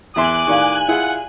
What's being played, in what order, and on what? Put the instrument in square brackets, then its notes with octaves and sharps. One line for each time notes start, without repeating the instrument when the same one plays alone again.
[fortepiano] E2 E5 C6 [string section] G#5 F#6 [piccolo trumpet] D6
[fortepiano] A2 D#3 [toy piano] G4 D5 F5
[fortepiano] E4 F4 G#4 [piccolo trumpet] F#5